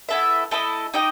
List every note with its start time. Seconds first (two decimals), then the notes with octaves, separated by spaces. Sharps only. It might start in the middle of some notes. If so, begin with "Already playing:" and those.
0.09 B3 E4 A4 E5
0.51 A3 E4 A4 D#5
0.94 D#4 G4 D#5 G5